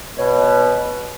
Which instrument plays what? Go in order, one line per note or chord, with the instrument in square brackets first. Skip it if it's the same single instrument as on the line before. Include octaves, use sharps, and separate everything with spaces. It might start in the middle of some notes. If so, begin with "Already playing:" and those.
[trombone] B2 [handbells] C#5